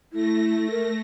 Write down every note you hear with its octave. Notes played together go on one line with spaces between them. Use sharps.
A3 E4 A#6
A#4